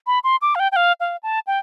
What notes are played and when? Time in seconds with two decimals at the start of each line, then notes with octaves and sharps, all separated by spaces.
0.07 B5
0.24 C6
0.42 D6
0.55 F5
0.60 G5
0.72 G5
0.76 F5
1.00 F5
1.23 A5
1.47 G5